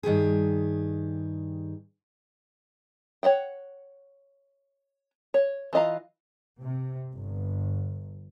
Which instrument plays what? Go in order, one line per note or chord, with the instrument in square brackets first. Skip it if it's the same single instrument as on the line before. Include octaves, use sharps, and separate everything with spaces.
[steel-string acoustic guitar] G2 D#3 G4 G#4
[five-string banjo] C#5 D#5 F#5 G5
C#5
E3 F4 D#5 F5 A#5
[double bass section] C3
G1